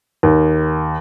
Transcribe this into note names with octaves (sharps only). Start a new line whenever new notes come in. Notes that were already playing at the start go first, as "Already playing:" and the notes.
D#2